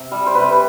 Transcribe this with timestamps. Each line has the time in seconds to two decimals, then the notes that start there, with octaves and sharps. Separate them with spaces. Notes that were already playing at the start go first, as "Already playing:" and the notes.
Already playing: C3
0.12 G3
0.26 C5
0.34 C3 B4